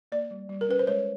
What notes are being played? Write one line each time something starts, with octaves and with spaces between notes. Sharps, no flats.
A#3 D5
G3
G3
A#4
C#4 B4
C5
G#3 C#5